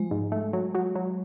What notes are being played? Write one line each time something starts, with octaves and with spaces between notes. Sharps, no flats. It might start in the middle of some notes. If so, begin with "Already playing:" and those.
Already playing: F3 G#3
G#2
A3
F#3
F#3
F#3